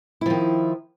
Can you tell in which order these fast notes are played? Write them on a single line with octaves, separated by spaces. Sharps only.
E4 F3 D#3